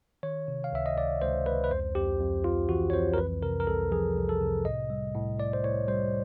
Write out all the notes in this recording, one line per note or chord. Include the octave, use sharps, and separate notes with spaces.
D#3 C#5
C3
F5
C#2 E5
D#5
C#2 D5
C#2 C5
C#2 B4
B4
F2 C5
F2 G4
F2
F2 F4
E3 F#4
C#5
F2 C5
A#4
C2 B4
C3 A#4
A#4
C2 A4
F3 G#4
C2
A4
C3
A2 D#5
G3
A2
A2 D5
C5
A2 C#5
G3 C5